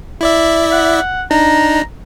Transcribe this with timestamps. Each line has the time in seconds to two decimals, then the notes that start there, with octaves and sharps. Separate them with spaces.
0.21 E4 D5 E5
0.72 F#5
1.31 D4 D#4 A#5